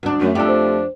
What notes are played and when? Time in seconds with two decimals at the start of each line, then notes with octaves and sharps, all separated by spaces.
0.03 D2 D4
0.20 F#2 A3
0.35 F2 F3 D4 G4 A4
0.48 C5